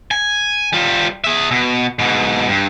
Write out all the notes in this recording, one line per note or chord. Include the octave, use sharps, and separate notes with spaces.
G#5
G3 F4
G#4 E5
B2
G#2 B2
G2